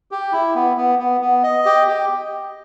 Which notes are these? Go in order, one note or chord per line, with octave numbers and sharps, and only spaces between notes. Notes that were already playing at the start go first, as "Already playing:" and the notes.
G4
E4
B3
B3
B3
B3
D#5
G4
G4